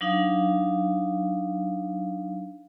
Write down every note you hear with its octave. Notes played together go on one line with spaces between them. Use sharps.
F#3 D4 D#4 F5